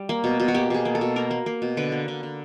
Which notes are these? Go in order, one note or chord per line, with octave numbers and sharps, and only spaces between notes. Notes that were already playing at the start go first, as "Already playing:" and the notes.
Already playing: G3
A#3
B2
B2
F#4
A#3 G4
B2 G#4
A#3
A4
B2
A#3 A#4
A#3
A#3
B2
D3 B4
A#3
D3
D3